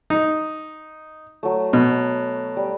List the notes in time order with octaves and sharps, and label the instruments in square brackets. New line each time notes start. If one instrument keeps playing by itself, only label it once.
[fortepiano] D#4
[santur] F#3 A3
[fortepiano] B2 [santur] F#5
[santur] G3